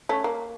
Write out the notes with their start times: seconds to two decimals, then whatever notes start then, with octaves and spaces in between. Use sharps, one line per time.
0.09 A3 C#4
0.24 A#3